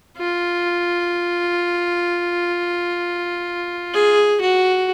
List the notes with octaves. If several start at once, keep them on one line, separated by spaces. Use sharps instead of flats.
F4
G#4
F#4